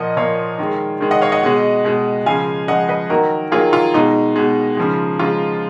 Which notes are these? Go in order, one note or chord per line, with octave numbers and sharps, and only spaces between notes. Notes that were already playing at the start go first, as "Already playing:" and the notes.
Already playing: A#2 F3 A#3 D#5 F#5
A#2 F3 A#3 C#5 F5
D#3 G#3
D#3 G#3
D#5 F#5
C#5 F5
D#5 F#5
B2 G#3
B2 G#3
C#3 F3 G#3 F5 G#5
C#3 F3 G#3 D#5 F#5
B4 D#5
D#3 F#3 A#3 F#4 A#4
D#3 F#3 A#3 F4 G#4
F4
B2 G#3 D#4
B2 G#3
C#3 F3 G#3
C#3 F3 G#3 F4